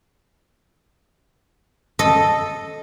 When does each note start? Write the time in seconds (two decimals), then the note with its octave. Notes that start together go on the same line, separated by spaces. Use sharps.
1.99 A4 D#5